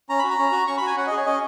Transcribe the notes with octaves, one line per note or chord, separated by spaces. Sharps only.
C#4 A#5
F#4 B5
A#5
C#4
F#4
C#4 C#6
B5
F#4
G#5
C#4 F#5
D#5
G#4
C#5
C#4 D#5